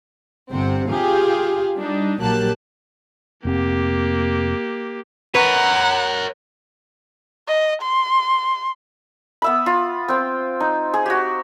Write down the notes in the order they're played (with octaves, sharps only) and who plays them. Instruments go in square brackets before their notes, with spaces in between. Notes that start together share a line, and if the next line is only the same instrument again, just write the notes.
[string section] G1 C3 C4 F#5
F4 G4 G#4 F5
G3 D4 D#4
A#1 F#3 A#3 G4 A5 F#6
[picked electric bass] F1 C4 [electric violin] A#3 G4
[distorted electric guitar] A#4 C#5 [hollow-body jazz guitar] B4 [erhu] F#5 [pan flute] A#5
[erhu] D#5
C6
[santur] B3 E5 B5
F4
C4 G5
D#4
G#4
F#4 G4